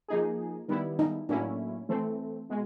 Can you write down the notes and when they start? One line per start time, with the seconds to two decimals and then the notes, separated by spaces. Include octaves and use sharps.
0.08 F3 A#3 D#4 G#4
0.68 D#3 G3 B3 D#4 E4
0.99 D#4
1.29 A2 F#3 A#3 C#4 D4 E4
1.89 E3 A3 C4
2.49 B2 G#3